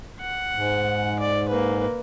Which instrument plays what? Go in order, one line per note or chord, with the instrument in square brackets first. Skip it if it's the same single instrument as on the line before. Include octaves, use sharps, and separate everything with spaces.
[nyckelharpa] F#5
[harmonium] G#2
[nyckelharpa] D5
A#3 B4